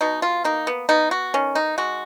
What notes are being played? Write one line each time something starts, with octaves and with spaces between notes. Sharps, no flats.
B2 D#4
F4
A#3 D#4
B3
B3 D#4
F#4
D#3 C#4
D#4
G#3 F#4